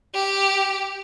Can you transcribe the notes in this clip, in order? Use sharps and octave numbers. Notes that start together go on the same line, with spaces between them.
G4